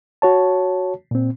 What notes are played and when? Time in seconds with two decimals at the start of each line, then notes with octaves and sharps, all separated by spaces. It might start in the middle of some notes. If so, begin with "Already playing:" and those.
0.22 F#4 C#5 A5
1.11 A#2 C4